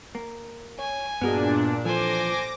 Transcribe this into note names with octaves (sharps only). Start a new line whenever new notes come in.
A#3
C#5 G#5
G2 A#2 B3 D4 F#4 G#4 A#4 D#5
F2 E3 F3 A4 C5 G#5 D6 A#6